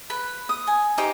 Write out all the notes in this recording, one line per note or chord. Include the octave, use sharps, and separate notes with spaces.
B4 B5
D#6
G#5
D#4 G4 C5 D6